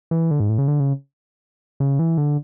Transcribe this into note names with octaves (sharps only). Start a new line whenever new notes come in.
E3
D3
G#2
A2
C#3
D3
C#3
C#3
E3
D3